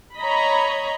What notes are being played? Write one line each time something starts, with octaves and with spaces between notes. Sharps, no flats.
C#5 D#5 A#5 B5